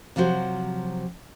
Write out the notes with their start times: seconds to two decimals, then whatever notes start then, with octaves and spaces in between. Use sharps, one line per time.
0.16 C3 F3 F#3 F#4 C5